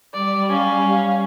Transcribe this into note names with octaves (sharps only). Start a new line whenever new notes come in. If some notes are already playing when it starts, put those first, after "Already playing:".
G3 D5
C#4 F5